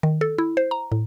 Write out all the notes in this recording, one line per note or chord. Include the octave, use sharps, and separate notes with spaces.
D#3
A4
E4
C5
A#5
A2